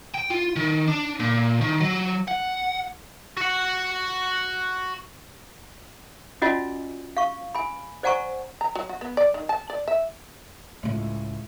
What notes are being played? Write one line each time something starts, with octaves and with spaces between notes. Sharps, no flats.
G5
F4
D#3
D4
A#2
D#3
F#3
F#5
F#4 F#5
C#4 F4 F#4 D5 D#5 G#5
F5 C#6
G#5 B5
C5 D5 F#5 G#5 A#5 C#6
A#5
F#3
F#4
B3
D5
D#3
A5
D5
E5
C#2 A2